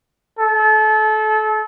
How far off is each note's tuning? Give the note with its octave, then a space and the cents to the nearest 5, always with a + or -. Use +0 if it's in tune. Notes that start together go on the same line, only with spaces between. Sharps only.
A4 -30